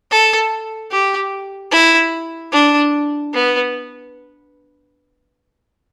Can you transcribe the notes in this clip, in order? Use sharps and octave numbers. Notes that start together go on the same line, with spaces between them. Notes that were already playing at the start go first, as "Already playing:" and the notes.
A4
G4
E4
D4
B3